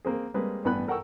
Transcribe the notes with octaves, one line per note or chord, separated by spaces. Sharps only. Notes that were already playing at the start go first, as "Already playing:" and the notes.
A#3 C4 G#4
G3 G#3 A#3 C4 G#4 B4
A1 G2 B3 B5 F#6
A4 A#4 F#5 G5 C#6 E6